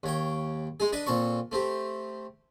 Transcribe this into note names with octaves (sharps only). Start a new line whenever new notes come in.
D#2 C#5 G5
G#3 D#4 G#4
D4 B4 D#5 A5
A#2 C4 A4 C#6
A3 C4 G4